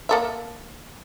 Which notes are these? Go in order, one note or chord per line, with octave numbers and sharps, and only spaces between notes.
A#3 A4 E5